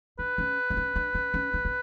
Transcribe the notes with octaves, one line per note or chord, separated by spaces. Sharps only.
D4 B4
C#4
B3
C#4
D4
C#4
C#4
D4
C#4